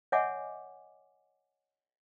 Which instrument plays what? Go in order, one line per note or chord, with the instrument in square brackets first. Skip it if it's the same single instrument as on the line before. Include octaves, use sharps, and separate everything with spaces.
[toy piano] C#5 D#5 E5 F#5 G#5 D6